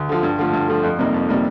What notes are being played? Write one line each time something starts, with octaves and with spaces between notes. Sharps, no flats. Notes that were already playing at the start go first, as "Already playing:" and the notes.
Already playing: D2
D3 F3
G2
D3 F3 A3
G2
D3 F3 A3
F2
C3 G3 A#3 D#4
F2
C3 G3 A#3 D#4